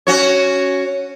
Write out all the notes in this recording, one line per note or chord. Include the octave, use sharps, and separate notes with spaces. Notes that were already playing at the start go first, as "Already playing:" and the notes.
C#4 F#4 C#5